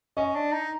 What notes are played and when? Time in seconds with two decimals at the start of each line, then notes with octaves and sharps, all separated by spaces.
0.17 C#4 D#5
0.35 D4
0.52 D#4